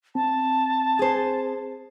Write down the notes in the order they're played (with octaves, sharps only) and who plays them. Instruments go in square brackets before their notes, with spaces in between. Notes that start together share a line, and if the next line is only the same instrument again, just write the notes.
[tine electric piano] C4 [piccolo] A5
[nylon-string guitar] G#4 C5